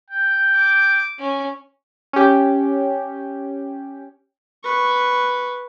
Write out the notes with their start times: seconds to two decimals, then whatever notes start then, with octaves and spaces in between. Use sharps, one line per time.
0.10 G5
0.55 D6
1.19 C#4
2.13 C#4 G4
4.64 B4 C#6